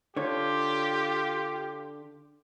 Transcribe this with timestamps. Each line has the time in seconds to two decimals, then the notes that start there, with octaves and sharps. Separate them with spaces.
0.16 D3 F4 G4 C#5